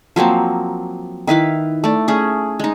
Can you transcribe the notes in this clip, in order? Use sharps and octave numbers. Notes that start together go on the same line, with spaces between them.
F3 F#3 A#3 C4
D#3 E4 B4 F5
A3 D5
A3 C#4 G#4
G#3 D#4